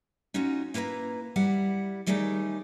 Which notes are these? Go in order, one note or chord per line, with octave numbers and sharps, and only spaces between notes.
C#4 D#4 F4 F#4
A#3 E4 B4 G#5 A#5
G3 E4 F#5
D#2 G3 A3 D#4 G#4 D5